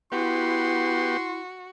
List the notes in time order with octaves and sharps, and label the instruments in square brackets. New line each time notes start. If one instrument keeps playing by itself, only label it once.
[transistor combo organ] B3 G4 [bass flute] E4 [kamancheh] F#4 [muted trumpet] C6